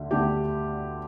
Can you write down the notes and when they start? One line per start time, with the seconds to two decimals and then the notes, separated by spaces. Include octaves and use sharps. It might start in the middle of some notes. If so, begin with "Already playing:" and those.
Already playing: D2 D3
0.11 D2 D3 G4